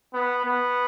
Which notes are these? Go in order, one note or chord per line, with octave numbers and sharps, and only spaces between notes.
B3
B3